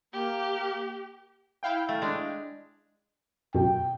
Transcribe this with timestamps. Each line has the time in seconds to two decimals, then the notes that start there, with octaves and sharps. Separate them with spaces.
0.13 A#3 G4
1.63 E4 F5 G5
1.89 A3
2.02 G#3 D4
3.55 F#2 B2 G5